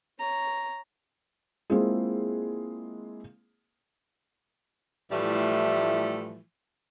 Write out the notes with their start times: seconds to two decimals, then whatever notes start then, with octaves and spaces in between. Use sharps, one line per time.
0.19 C#5 A#5
1.70 G#3 A#3 C4 E4 F4 G#4
5.12 A2 E3 F3 G3 A3